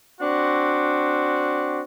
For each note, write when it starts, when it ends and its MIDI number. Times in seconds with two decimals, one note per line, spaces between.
0.20 1.83 60
0.20 1.83 62
0.20 1.83 66